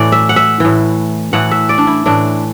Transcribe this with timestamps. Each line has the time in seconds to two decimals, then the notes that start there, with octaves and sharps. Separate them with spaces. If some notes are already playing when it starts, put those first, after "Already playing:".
Already playing: A2 E3 D5
0.12 E5
0.29 F#5
0.36 E5
0.60 A2 E3
1.33 A2 E3 F#5
1.51 E5
1.69 D5
1.78 D4
1.87 E4
2.06 A2 E3 D4